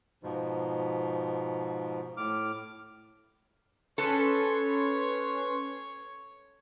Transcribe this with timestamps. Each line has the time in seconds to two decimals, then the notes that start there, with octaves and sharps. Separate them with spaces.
0.23 G#2 B2 F3
2.17 A2 D6 F6
3.98 C#4 A4 B4 C#5 C6